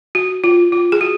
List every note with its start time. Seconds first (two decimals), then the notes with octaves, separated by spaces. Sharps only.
0.15 F#4
0.44 F4
0.72 F4
0.92 G#4
1.01 F#4